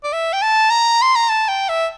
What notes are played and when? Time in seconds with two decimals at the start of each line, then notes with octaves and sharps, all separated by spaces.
0.04 D5
0.13 E5
0.33 G5
0.42 A5
0.71 A#5
1.02 C6
1.16 A#5
1.29 A5
1.48 G5
1.69 E5